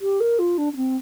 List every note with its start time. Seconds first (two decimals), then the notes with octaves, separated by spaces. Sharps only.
0.01 G4
0.20 A#4
0.39 F4
0.58 D4
0.73 D4
0.76 C4